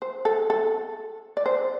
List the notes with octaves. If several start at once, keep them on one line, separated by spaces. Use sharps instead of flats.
C5
A4
A4
D5
C5